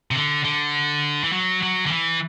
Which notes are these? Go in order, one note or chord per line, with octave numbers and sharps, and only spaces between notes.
C3
D3
D3
E3
F#3
F#3
D3
E3